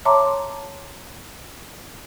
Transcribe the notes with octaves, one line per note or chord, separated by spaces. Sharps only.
C#5 E5 A5 A#5 C6 D6